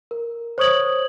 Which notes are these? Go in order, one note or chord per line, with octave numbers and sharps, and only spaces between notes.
A#4
C5 C#5 C#6 D#6 G#6 F#7